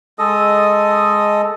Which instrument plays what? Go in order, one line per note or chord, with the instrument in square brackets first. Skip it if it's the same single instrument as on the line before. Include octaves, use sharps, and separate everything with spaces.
[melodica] G#3 A4 D#5 D#6